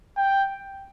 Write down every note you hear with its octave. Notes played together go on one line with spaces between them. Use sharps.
G5